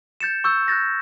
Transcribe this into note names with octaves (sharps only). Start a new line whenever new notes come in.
G6 A6 C#7 E7
C#6 E6 G6
F#6 G6 A6 A#6